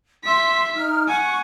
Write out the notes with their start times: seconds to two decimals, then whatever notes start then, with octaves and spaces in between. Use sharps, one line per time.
0.24 E5 C6 B6
0.75 D#4 F6
1.08 F#5 G#5 C#6